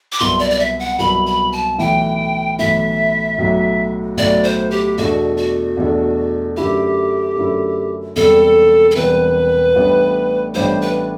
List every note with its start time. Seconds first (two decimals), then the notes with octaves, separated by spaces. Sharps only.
0.12 D6
0.19 C2 B2 F#3 B3 E4 C6
0.39 D5
0.51 D5
0.60 E5
0.79 F#5
0.99 C2 B2 F#3 B3 E4 B5
1.26 B5
1.52 A5
1.79 B1 A2 E3 G5
2.59 B1 A2 E3 E5
3.38 B1 A2 F#3
4.17 B1 A2 F#3 D5
4.44 C5
4.71 G4
4.98 E2 B2 A3 D4 F#4
5.37 F#4
5.77 E2 B2 A3 D4
6.57 F#2 D3 A3 E4 G4
7.36 F#2 D3 A3 E4
8.15 E1 E2 C3 G3 C4 A4
8.91 A4
8.95 E1 E2 C3 G3 C4 B4
9.75 A1 A2 G3 B3 D4
10.55 A1 A2 G3 B3 D4 C5
10.82 B4